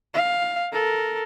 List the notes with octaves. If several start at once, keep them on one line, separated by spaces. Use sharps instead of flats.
F5
A4 A#4